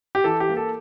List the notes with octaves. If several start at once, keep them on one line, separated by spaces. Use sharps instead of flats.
G4
E3 A4
G4
A#3
A4